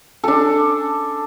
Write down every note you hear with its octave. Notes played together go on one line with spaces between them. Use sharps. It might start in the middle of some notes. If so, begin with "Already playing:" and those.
D4 A4